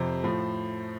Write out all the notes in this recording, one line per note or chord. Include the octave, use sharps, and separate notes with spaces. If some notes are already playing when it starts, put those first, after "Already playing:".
Already playing: F2 C3 C5
A2 F3